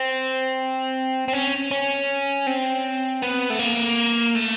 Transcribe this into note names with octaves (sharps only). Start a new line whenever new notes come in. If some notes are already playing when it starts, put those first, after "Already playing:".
Already playing: C4
C4
C#4
C#4
C4
B3
A3
A#3
A3